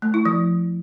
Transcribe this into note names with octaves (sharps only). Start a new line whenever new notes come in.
A3
E4
F3